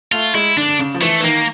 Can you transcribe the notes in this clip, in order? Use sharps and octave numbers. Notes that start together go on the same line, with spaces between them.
A3 F4
G#3 E4
D3 D4
D3
C#3
F3
E3 A3
E3
D#3 A#3